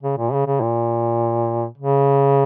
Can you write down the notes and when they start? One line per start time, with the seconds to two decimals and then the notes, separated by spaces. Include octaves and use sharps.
0.03 C#3
0.18 A#2
0.33 C#3
0.47 C#3
0.61 A#2
1.78 C#3